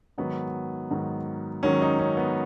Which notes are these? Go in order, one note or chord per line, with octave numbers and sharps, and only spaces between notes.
G#2 D#3 F#3 B3
G#2 D#3 F#3
G#2 D#3 F#3 C#4
D#4
C#4
B3